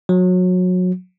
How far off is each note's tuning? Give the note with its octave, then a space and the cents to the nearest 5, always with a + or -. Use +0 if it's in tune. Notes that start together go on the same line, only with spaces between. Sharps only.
F#3 -25